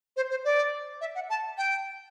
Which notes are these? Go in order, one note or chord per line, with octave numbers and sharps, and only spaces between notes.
C5
C5
D5
E5
F#5
A5
G5